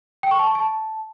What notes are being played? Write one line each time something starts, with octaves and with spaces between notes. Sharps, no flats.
G5
C#6
A5
C#6
A5